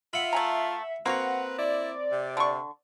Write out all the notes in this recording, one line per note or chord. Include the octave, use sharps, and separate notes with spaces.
F4 E5 F#5 B5
A3 G#5 A#5
A#3 C4 F#4 B4 F#5 A#5
E4 D5
C3
D3 C#6